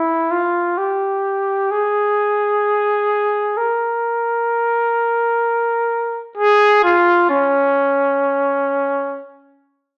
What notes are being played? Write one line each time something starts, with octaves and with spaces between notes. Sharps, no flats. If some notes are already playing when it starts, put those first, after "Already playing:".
Already playing: E4
F4
G4
G#4
A#4
G#4
F4
C#4